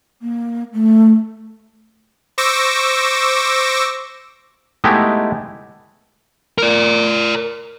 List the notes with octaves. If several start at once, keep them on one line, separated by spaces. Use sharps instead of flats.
A#3
A3
C5 C#6 D6 E6 A#6
G#3 A3 B3 D#4 E4 G4
A#4 D5